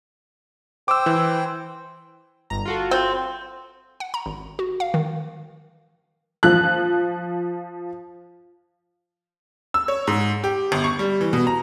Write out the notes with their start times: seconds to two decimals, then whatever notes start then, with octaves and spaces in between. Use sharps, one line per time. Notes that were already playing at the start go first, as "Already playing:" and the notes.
0.88 C5 G5 D6 E6
1.06 E3
2.50 G1 A#5
2.66 F4 F#4 A4
2.91 C4
4.00 F#5
4.14 A#5
4.26 G#1
4.59 F#4
4.80 F5
4.94 D#3
6.43 F3 F#6
9.74 E6
9.88 C#5
10.07 G#2
10.44 G4
10.72 G1
10.84 C#6
10.99 G3
11.21 E3
11.33 B2
11.47 A#5